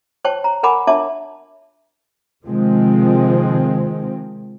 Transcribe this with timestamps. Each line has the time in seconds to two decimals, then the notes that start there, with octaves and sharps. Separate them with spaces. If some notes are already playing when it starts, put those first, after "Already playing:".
0.25 C5 C#5 G5 A5 C#6
0.44 A#5
0.63 A#4 F#5 G#5 B5 D6
0.87 D4 E4 C#5 E5 A5 D6
2.44 C3 D#3 F3 G#3 C4